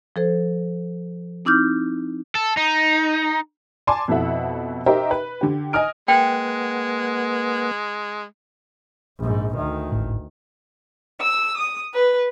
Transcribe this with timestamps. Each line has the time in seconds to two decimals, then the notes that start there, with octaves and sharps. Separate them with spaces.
0.16 F3 A4 C5
1.45 C4 D#4 E4 D6 F6 G6
2.35 A4
2.57 D#4
3.87 D5 G#5 A5 C6 D6
4.08 F2 B2 E4 A4 E5 F#5
4.86 D#4 G4 A#4 C5 D#5 E5
5.11 B4
5.41 D3 G4
5.73 D#5 G#5 D#6 F6 D7
6.08 G#3 A#3 B4 F#5 G5
9.19 A#1 G#2
9.57 D2 D#3
9.92 G#1 A2
11.21 E6
11.57 D#6
11.94 B4